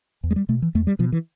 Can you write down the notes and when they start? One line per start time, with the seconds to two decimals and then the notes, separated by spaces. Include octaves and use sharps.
0.24 E2
0.31 G#3
0.36 G3
0.49 B2 A3
0.62 E3
0.75 E2 A3
0.87 G3
0.99 B2 F3
1.12 E3